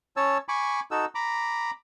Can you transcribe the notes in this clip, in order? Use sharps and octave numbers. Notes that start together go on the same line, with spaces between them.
C#4 C#5 A5 E6
G#5 B5 C#6 D6
D#4 F#4 A4 E6
A#5 B5 D6